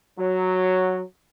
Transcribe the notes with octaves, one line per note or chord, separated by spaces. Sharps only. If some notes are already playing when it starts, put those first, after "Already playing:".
F#3